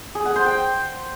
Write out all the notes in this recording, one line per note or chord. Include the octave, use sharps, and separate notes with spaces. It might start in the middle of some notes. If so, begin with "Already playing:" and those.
G#4
F#5
C5
G5